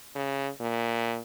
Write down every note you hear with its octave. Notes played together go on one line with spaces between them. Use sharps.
C#3
A#2